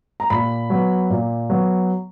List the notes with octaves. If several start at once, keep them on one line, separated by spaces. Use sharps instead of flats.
A#5
A#2 B5
F#3 B3
A#2
F#3 B3